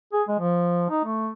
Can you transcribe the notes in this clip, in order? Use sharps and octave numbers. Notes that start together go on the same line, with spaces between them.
G#4
G#3
F3
D#4
A3